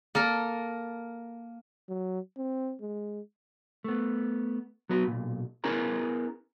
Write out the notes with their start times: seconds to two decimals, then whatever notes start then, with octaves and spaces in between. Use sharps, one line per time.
0.15 A#3 A4 A#4
1.89 F#3
2.38 C4
2.81 G#3
3.84 A3 B3
4.89 F#3 B3 F#4 B4
5.07 B1 A#2
5.64 B3 C#4 E4 G#4 A#4 A#5